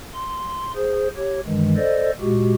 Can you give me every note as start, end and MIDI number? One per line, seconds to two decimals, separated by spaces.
0.14 0.71 84
0.75 1.08 68
0.75 1.08 72
1.16 1.40 67
1.16 1.40 73
1.46 1.77 43
1.46 1.77 51
1.46 1.77 52
1.46 1.77 56
1.77 2.11 69
1.77 2.11 72
1.77 2.11 74
1.77 2.11 75
2.20 2.54 46
2.20 2.54 56
2.20 2.54 66
2.20 2.54 67